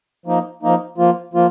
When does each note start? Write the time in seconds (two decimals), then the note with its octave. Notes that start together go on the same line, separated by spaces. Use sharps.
0.26 F3 A#3 D#4
0.63 F3 A#3 D#4
0.98 F3 A#3 F4
1.34 F3 A#3 F4